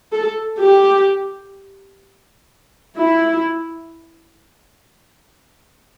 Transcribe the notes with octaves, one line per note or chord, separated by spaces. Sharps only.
A4
G4
E4